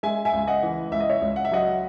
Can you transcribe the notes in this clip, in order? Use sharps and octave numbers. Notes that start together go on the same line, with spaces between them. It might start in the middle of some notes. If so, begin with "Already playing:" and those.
G#3 E5 G#5
E5 G#5
C#2
D#5 F#5
E3
C#2 E5
D#5
C#5 E5
C#2
F#5
E5
F#3 D#5 F#5